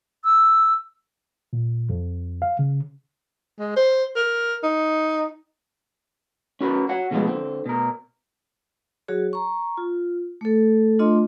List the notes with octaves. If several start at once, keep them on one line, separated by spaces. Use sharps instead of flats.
E6
A#2
F2
F5
C#3
G#3
C5
A#4
D#4
C#4 F#4 A#4 B4
F#4 C#5 F#5
B2 D3 F3 G3 G#3 B3
D3 C4
B2 A#4
F#3 F#4 G#4 C#5
A#5 C#6
F4
A3 A4
A3 D4 F4 D#5 C6